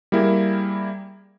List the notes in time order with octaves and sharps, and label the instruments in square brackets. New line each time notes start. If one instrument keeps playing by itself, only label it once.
[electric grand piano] G3 A#3 E4 G#4 A#4